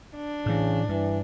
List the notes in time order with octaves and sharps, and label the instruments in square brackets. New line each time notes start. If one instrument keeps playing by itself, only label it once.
[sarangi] D4
[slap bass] A2 E3 [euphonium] C#3
[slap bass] G2 [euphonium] E3